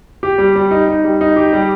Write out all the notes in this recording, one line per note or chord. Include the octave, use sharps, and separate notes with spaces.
G4
G3
G3
D#4
D#4
G3
D#4
G4
G3